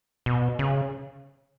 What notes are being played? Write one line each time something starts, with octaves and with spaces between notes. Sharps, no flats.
B2
C#3